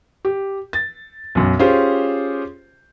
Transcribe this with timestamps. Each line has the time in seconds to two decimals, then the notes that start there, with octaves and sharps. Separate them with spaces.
0.25 G4
0.73 A6
1.35 B1 F#2
1.59 C#4 F4 G4 G#4 C5